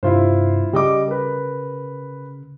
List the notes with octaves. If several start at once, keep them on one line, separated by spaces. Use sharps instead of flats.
G2 C3 E4 F4 C5
C#3 G3 D#5 D6
A#4 B4